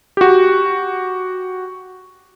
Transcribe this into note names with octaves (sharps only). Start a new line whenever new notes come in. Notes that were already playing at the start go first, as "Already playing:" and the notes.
F#4 G4